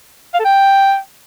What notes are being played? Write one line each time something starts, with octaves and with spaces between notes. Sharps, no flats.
F5
A4
G5